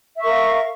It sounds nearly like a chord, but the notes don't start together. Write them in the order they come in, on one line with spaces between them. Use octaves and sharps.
E5 C#6 A#4 F5